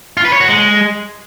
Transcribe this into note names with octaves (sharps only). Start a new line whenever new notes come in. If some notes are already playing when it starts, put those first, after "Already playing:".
F4
B4
C#5
F#4
G#3